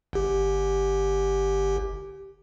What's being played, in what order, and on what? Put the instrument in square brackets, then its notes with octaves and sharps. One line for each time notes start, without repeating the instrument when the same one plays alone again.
[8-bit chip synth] G1 G4